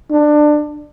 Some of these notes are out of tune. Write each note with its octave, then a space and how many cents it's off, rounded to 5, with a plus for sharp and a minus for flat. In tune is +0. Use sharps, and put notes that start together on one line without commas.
D4 +20